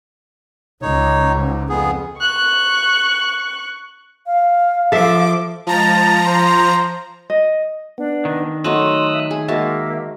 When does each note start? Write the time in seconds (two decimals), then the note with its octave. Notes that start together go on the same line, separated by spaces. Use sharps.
0.82 C#2 D#4 C#5
1.35 G#2
1.69 F2 B3 G#4
2.19 C#6 F#6
4.26 F5
4.92 F3 A4 E5 D6
5.67 F3 G#3 A5 A#5
6.25 C5 C6
7.30 D#5
7.98 B3 D4
8.25 D#3
8.64 F#3 A3 D#4 C6 D#6 E6 F#6
9.13 E5
9.31 G#4
9.48 G#3 A#3 F#4 E5 A5